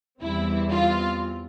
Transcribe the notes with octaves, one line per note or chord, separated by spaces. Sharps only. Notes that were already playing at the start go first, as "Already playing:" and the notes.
E2 E3 G3 C4 E4
F4